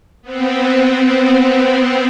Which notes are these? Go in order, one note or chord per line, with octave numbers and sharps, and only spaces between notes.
B3 C4